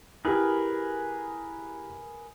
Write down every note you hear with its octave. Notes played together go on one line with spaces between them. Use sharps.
E4 G4 G#4 A#4 B4